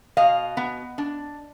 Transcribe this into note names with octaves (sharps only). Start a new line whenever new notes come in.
B2 D#5 F5
B3
D4